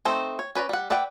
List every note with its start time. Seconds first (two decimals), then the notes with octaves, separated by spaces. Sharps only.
0.05 A3 C4 D#4 A4 C5
0.39 C#5
0.55 C#4 B4 D5 A#5
0.69 G3 F#5
0.90 B4 D5 E5 F#5 G5